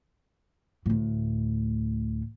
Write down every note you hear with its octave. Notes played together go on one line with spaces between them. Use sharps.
D2 A2